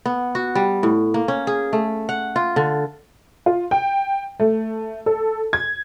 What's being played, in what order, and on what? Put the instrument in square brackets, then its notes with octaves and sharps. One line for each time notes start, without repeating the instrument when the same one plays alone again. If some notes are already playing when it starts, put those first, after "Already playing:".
[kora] B3
F#4
G3
A2
A#3
C#4
G#4
A3
F#5
F4
D3
[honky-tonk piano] F4
G5
A3
A4
G#6